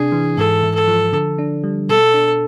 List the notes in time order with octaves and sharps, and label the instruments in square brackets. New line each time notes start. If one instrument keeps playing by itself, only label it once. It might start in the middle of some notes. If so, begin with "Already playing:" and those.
Already playing: [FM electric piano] C3 D4 [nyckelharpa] G#4
[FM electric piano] E3
[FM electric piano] G#2 [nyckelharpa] A4
[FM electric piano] G#2
[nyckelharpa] A4
[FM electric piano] F3
D3
D4
G3
[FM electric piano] B2 [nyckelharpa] A4
[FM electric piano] D4